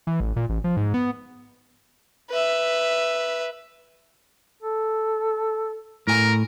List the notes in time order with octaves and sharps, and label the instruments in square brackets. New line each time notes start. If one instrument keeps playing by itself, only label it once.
[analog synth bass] E3
A1
A#2
A1
F3
G#2
B3
[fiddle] B4 E5
[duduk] A4
[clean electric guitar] A2 G#5 A#5 [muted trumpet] A#4